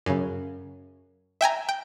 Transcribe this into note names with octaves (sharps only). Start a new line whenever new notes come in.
F#2 C#3
E5 G5 G#5 A#5
G5